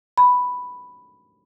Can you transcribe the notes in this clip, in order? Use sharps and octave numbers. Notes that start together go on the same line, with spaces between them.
B5